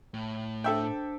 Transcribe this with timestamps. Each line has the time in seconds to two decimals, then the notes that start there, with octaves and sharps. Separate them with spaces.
0.14 A2
0.64 D4 A4 C5 E5 G5 A5